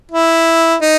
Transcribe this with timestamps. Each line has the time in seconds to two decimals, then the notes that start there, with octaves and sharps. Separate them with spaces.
0.11 E4
0.82 D#4